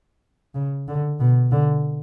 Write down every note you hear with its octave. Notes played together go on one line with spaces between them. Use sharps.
C#3
D3
B2
D3